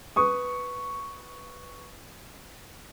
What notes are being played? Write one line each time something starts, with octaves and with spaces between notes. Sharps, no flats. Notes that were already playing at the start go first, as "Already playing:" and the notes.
B4 C#6 D#6